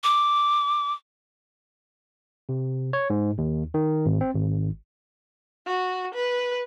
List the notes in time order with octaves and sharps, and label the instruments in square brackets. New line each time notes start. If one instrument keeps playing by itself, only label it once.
[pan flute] D6
[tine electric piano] C3
C#5
G#2
D#2
D#3
G#1
C4
G#1
[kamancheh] F#4
B4